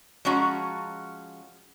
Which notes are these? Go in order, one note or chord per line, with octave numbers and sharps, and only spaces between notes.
F3 G#3 C#4 F#4 A#5